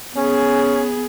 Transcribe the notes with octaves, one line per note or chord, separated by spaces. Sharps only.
B3 C#4 G#4